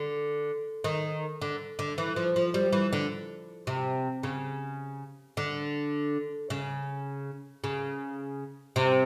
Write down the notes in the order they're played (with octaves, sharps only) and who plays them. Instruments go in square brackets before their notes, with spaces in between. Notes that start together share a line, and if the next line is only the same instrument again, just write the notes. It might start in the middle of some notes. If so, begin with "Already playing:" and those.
Already playing: [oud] D3
D#3
D3
D3
E3
F3
F3
G3
E3
D3
C3
C#3
D3
C#3
C#3
C3